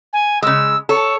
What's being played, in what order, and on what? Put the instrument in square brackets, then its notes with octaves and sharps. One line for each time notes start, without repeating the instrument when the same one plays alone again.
[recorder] G#5
[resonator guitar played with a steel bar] C#3 G#3 [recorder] E6
[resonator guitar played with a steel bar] A4 [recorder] C#5